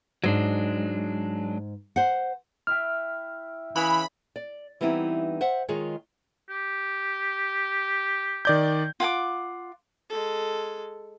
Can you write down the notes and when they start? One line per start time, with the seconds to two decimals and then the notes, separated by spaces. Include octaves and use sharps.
0.24 G#2 F#3 G#3 D4
1.96 C5 F#5
2.67 E4 E5 G5 F6
3.76 C#3 E3 G#4 B4 B5
4.36 D5
4.81 E3 G3 B3 C4 D#4 E4
5.41 C5 E5 F#5
5.68 D#3 G#3 F4 G#4 C#5
6.49 G4
8.45 D#3 D5 G6
9.00 F4 F#5 G#5 D6
10.09 G#3 A4